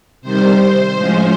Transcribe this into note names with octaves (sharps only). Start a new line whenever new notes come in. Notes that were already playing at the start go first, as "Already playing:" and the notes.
C3 D#3 G3 C5
A2 F3 G#3 C#4